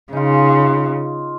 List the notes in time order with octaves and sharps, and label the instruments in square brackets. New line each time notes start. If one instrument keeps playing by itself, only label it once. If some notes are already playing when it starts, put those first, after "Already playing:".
[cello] C#3 [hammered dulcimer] D#4 F4